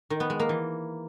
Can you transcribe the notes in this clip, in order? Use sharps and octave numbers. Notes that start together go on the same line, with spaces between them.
D#3
B3
G#3
A#3
E3